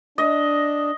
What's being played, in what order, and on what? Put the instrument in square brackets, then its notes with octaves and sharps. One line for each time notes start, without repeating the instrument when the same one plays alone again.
[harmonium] D4 [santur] D#5